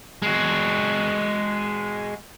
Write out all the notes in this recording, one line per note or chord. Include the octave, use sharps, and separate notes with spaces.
G#3 F#4